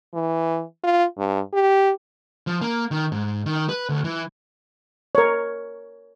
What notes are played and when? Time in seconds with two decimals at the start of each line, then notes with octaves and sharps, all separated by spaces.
0.14 E3
0.84 F4
1.18 G2
1.53 G4
2.47 F3
2.61 A#3
2.91 D#3
3.12 G#2
3.46 D#3
3.69 B4
3.89 D2
4.04 E3
5.15 A#4 C#5